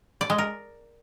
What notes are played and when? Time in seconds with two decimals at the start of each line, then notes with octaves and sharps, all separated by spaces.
0.21 D5
0.30 G#3
0.38 A#4